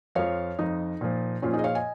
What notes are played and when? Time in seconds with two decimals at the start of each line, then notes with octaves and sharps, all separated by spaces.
0.15 F2 F3 C#5 F5
0.59 F2 F3 D#4
1.01 A#2 F3
1.42 A#2 F3 C#4 F4
1.53 D#4 G#4
1.59 D#5
1.64 C#5 F5
1.75 D#5 G#5